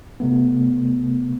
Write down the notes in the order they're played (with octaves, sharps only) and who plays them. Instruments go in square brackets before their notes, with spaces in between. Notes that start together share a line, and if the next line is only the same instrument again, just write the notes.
[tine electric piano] C3 A3 B3